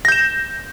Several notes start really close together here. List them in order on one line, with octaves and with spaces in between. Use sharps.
A#6 G6 E7